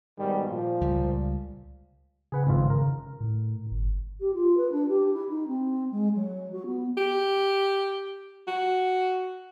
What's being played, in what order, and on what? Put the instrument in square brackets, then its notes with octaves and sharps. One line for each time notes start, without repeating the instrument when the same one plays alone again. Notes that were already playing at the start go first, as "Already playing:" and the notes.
[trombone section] G#2 B2 D#3 [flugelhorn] G3
[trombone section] A#2 [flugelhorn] F3
[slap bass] C#2 G3
[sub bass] C#3 [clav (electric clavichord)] G#4 B4 F#5
[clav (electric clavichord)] G#1 F2 F4
A#4
[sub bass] A2
G1
[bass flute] G4
F4
B4
D4
G4
E4
D#4
C4
G#3
F#3
F#4
B3
[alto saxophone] G4
F#4